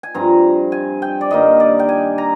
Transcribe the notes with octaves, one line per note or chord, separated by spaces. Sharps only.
G#5
G2 F3 C4 A#5
G#5
G5
D5
G2 D#3 A#3 D#5
D5
G5
G#5
A#5